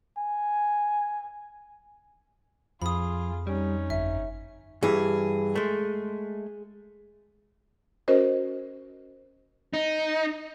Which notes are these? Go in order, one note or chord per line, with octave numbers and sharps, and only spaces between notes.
G#5
F2 F3 F4 G#4 B5 D#6
G3 C#4 D#4
G1 E5
G2 E3 G#4
G#3 A3
C#4 F#4 A#4 C5 D#5
D#4